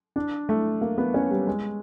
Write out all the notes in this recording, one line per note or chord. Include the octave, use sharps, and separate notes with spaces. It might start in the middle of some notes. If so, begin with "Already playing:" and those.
D4
A3
A#3
B3
C#4
G3
G#3